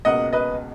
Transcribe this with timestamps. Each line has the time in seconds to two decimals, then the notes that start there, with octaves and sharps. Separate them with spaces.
0.05 C#2 B2 A#3 D#5 F#5
0.33 B4 D#5